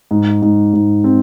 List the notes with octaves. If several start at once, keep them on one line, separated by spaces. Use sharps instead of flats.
G#2
G#2
G#2
C4